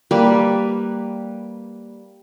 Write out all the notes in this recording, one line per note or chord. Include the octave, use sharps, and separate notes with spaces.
G3 A#3 B4